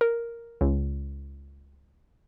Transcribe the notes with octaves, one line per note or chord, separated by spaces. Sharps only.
A#4
C#2